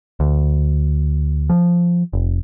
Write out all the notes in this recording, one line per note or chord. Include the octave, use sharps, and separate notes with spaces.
D2
F3
F1